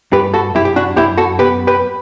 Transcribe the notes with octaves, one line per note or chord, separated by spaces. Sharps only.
G2 G4 B4
F#4 A4
F#2 E4 G4
G4
D4 F#4
F#2 E4 G4
F#4 A4
B3 G4 B4
G4 B4